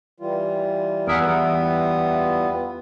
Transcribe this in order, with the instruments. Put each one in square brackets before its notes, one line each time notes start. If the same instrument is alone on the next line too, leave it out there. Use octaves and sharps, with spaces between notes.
[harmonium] E3 G3 F4
[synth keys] E2 E5 F#5 [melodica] G#4 A#4
[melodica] B3